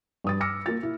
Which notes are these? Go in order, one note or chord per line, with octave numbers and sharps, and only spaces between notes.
G2 D#6 A6
D6 E6 F6 A#6 C#7
A#3 F4 A6
E4